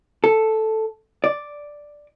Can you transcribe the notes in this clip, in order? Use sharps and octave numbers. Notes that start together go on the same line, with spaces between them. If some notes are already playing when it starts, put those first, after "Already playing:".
A4
D5